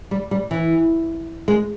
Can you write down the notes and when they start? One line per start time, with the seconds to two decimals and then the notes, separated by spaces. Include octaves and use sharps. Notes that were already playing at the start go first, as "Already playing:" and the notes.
0.11 G3
0.31 G3
0.51 E3
1.48 G#3